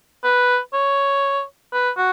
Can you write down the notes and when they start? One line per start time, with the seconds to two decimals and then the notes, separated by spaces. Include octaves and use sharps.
0.24 B4
0.73 C#5
1.73 B4
1.97 F#4